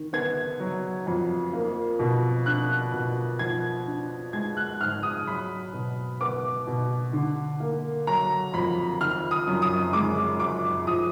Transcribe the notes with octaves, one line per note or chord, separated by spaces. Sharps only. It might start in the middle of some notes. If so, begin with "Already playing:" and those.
Already playing: D#3
B3 G#6
F#3
F2
A#3
B2
D4 F#6
B2
F3 G#6
D4
G#3 G#6
F#6
G#2 F6
D#6
F#3 B5
B2
B3 D6
B2
D3
A#3
F#3 A#5
F2 B5
D#3 F6
D#6
F#2
D#6
G#3 D6
F#2 D6
F3 D#6